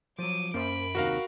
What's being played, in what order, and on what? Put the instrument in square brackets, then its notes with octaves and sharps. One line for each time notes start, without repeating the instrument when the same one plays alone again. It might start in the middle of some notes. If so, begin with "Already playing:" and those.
[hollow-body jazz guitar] F3 F#3 [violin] D6 D#7
[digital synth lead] F#2 [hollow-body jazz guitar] A#3 C5 [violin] B5 D7
[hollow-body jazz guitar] D#2 C3 D#3 [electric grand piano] F#4 A#4 F5